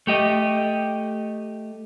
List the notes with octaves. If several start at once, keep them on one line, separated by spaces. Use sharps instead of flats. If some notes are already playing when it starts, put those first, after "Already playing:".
A3 G4 D#5